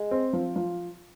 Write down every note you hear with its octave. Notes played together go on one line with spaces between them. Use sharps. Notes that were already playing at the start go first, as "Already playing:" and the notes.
Already playing: G#3
C4
F3
F3